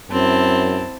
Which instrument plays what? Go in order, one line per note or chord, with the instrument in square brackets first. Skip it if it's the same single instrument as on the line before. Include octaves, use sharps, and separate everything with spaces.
[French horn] F#2 [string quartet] C4 E4 A5